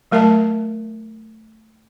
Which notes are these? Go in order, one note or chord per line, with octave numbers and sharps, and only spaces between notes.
F#3 A3 A#4 E5 A5